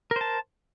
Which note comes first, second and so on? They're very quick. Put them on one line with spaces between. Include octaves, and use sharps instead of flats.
A#4 C5 A5